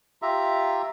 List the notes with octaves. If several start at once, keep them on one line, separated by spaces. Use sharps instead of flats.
F4 G4 E5 A#5